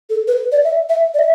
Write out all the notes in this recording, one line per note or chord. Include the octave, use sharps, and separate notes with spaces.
A4
B4
D5
E5
E5
D5
E5